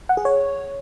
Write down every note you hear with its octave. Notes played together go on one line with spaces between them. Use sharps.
F#5
G#4
C#5